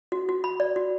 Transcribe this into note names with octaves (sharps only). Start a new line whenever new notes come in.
F#4
F#4
B5
D5
F#4